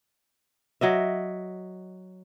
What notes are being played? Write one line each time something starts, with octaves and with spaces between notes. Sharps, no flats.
F#3 D#5 E5